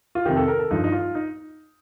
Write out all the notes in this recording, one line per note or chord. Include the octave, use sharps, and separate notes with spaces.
F4
F2 C3 D#3 G4
A4
A#4
A4
G2 F3 D#4
D#4
F4
D#4